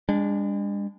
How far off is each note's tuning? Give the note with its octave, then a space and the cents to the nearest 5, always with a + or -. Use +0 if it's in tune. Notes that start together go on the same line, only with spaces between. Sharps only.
G#3 -45 D4 -15